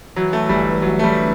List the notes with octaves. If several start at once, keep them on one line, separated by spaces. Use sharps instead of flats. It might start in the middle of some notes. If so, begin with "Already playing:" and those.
E3 F#3
A3
G1 G3
G1 F#3
A3
G3